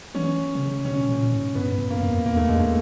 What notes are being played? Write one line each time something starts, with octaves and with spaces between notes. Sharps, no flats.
E3 C#4
C3
C#3
B2 C#4
A#2
G#2
G2 B3
F#2
A#3
F2
E2 A#3
A3
E2 G#3
A3